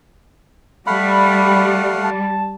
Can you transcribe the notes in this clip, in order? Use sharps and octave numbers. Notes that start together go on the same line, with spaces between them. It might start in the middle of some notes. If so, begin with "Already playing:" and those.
G3 A3 F5 F#5 B5
A5